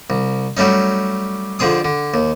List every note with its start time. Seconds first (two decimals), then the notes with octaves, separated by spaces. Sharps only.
0.10 C2
0.57 F#3 G3 A3 C#4 D#4
1.59 F2 D3 C4 G#4 D#6
1.85 D3
2.14 D#2